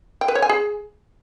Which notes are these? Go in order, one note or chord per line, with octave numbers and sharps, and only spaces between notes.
G5
B4
C#5
G#5
G#4